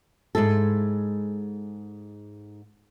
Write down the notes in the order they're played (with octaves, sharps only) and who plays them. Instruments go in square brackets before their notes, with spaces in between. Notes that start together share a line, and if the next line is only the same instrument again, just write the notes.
[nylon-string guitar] G#2 G#3 E4 A4